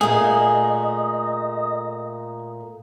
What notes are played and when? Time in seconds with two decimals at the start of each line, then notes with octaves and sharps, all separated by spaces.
0.01 A#2 A3 G#4 D#5